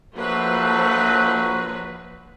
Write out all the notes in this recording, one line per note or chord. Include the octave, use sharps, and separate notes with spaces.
A#1 F3 F#3 A3 A#3 B4